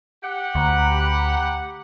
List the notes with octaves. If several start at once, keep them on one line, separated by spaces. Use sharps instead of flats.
G4 F#5
D2 A#5 B5 F#6